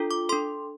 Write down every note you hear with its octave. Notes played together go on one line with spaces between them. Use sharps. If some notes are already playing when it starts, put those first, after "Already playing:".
Already playing: D4 F4 A4
D6
D4 A4 C6